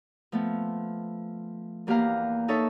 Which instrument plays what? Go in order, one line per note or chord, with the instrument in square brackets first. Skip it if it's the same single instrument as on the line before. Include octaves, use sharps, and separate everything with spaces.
[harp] F3 A3 B3
E2 A#3 G4 B4 F5 A#5
D#4 A4 C#5 E5 A5